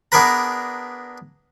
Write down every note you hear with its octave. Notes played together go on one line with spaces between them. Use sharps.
B3 D4 G#4 A#4 B4 A#5